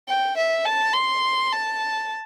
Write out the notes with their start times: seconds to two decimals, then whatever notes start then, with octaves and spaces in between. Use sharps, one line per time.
0.08 G5
0.37 E5
0.65 A5
0.94 C6
1.52 A5